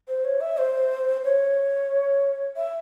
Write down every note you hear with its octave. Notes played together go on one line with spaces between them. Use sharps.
C5
C#5
E5
C5
C#5
E5